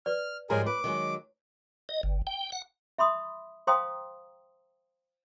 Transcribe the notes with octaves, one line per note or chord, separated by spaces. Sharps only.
B4 D5 F6
G#2 F3 G3 G#4 A#4 C#5 G#5 A#5
B4 D6
D#3 F#3 G#3
D#5
G1
G5
F#5
E5 B5 C6 D#6
C5 F5 G5 A#5 C6 D#6